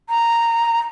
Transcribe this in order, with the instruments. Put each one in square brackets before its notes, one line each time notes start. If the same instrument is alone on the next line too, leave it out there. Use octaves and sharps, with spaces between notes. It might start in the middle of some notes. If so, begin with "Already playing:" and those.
[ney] A#5